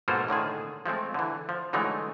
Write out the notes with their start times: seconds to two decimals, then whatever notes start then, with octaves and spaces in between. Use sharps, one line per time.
0.08 G#2 B2 A#3 F4 A4 C5
0.28 A2 D3 D#3 G#4
0.86 F3 G#3 A3 C4
1.14 D3 E3
1.49 F3
1.73 D3 E3 F#3 G#3 A3 D#4